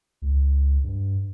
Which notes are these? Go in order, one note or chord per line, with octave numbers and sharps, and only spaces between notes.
C#2
G2